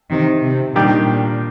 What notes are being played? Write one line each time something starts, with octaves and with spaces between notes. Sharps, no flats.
C3 D#3
C3
A#2 D#3 G3 A#3 D4 G4
A#2